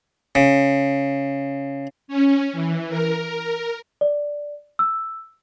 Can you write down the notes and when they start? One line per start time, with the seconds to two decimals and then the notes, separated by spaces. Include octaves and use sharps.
0.35 C#3
2.08 C#4
2.53 E3
2.89 A#4
4.01 D5
4.79 E6